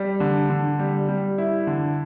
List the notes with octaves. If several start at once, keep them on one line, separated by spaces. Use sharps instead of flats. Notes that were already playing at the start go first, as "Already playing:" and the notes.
Already playing: G3
D3
D3
G3
G3
E4
D3